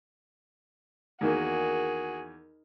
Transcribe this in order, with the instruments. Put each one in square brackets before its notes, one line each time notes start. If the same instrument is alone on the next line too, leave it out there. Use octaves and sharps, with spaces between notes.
[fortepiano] E2 D#3 A#3 [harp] D#4 A#4 [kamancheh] F#4 G#4